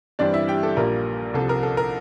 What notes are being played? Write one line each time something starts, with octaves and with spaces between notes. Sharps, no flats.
G2 E3 G3 C4 D4 D5
E4 E5
G4 G5
A4
A#1 A#2 G3 A#3 A#4
C2 C3 F3 A4
A#4
A4
A#4